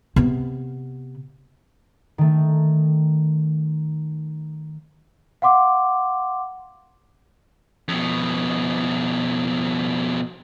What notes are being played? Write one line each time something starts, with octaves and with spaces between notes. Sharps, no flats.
C3 B3
D#3 A3
F5 F#5 C6 D6
F2 B2